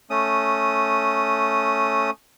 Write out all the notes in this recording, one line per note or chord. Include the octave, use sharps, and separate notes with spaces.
A3 C#4 D#6